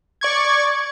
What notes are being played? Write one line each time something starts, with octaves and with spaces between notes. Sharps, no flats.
D5 C#6 G#6